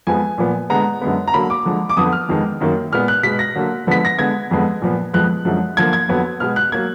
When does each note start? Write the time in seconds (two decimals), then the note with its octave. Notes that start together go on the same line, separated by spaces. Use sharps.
0.07 F2 F3 G#3 B3 G#5
0.38 A#2 F3 B3
0.70 D3 G#3 B3 A#5
1.01 F#2 D3 G#3 B3
1.27 A#5
1.33 D3 F#3 A#3 B5
1.50 D6
1.65 D3 F3 G#3
1.90 D6
1.97 F2 D3 F3 B3 D#6
2.12 F6
2.29 F2 D#3 G#3 B3
2.60 F#2 D#3 F#3 A#3
2.92 A#2 G#3 B3 F6
3.08 F#6
3.23 B2 G#3 B3 B6
3.39 A#6
3.55 D3 F#3 A#3
3.87 D3 F3 G#3 B3 B6
4.05 A#6
4.19 D3 G#3 B3 G#6
4.51 F2 D3 G#3 B3
4.82 A#2 F3 B3
5.13 F2 F3 G#3 B3 F#6
5.45 F#2 D3 F3 G#3
5.77 D3 F3 A#3 G#6
5.93 G#6
6.09 F2 D3 F#3 B3
6.40 B2 G#3 B3 F6
6.56 F#6
6.72 F#3 A#3 G#6